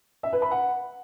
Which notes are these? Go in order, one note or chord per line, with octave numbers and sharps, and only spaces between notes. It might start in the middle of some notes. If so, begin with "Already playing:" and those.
E5
B4
B5
F#5